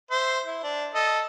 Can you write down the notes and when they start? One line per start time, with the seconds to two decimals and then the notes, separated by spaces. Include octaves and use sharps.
0.11 C5 E5 C6
0.46 E4
0.63 D4
0.94 A4 D#5